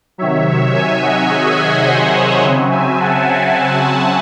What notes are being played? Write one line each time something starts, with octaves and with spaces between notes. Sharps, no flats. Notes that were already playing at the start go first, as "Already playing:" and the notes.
C3 D#3 F#3 C#5 E5
E5 G#5
D#5 F#5
G#4
G#4
C5 D#5
C#5 E5
C#3 F#3 C4
E5 G#5
F#5 A5